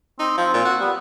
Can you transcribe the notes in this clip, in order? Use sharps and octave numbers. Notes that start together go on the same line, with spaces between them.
C4 D#4
F3 C4
A#2
F#4
G3 B3